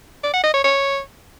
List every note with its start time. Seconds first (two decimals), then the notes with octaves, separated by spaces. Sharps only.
0.23 D5
0.34 F#5
0.44 D#5
0.54 C#5
0.64 C#5